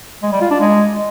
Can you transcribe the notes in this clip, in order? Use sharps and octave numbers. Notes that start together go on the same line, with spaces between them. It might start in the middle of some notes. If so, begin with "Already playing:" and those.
G#3
G3
F4
D4
G#3